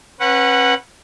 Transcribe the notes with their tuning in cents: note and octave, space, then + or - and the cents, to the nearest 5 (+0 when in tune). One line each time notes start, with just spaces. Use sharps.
C#4 -40 B4 -15 F#5 +0